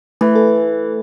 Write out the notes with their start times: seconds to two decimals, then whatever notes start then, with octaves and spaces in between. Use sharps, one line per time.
0.21 E3 A3
0.35 A4